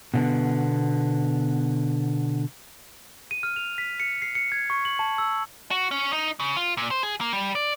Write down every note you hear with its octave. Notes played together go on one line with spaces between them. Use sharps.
B2 D3 B3
D#7
F6
F7
B6
C#7
C7
C#7
G#6
C#6
F#7
A5
E6
F#4
C#4
D#4
C#3
F4
A#2
C5
G#4
A#3
G3
D5